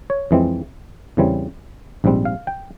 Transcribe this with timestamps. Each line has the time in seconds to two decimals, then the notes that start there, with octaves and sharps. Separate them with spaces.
0.10 C#5
0.31 F2 E3 G#3 C4
1.17 E2 C#3 E3 G3 C4
2.04 A#1 G#2 G3 C4
2.25 F5
2.47 G5